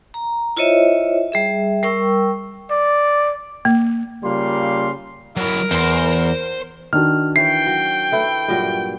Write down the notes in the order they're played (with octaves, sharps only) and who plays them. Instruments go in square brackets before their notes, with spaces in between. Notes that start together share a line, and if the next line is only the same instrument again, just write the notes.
[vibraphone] A#5
E4 F4 C5 C#5 D#5 E5
G3 G#4 E5
G3 A#4 G5 C#6 E6
[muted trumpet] D5
[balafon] A#3
[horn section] C#3 G3 A#3 F4 F5 C6
[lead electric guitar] F#3 E4 [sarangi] A#4
[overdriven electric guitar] E2 [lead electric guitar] C5 C6
[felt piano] D#3 D4 F#4 [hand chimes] F6
[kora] E3 C#5 [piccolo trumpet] G5 [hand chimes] C7
[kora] F#3
A3 E4 B4
G2 A#2 F#3